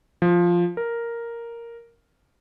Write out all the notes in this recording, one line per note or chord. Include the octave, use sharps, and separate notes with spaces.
F3
A#4